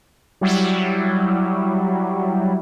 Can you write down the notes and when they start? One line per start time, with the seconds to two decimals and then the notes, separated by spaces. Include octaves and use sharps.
0.41 F#3 G3 E4